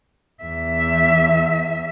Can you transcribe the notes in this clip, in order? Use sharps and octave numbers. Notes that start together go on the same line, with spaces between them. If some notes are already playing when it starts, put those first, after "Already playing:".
E2 E5